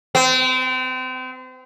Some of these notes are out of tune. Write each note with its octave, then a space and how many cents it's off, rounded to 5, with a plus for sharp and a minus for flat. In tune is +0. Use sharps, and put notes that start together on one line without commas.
C4 -35